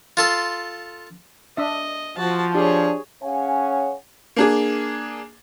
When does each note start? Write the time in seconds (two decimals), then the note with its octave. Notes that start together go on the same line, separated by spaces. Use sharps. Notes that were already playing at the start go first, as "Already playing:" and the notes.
0.17 F4 A4 C6
1.57 D4 D#5 E5
2.17 F3 F#4 A5
2.55 D4 G4 G#4 C#5
3.23 C#4 G#4 C#5 F5 F#5 G#5
4.36 A#3 D4 G#4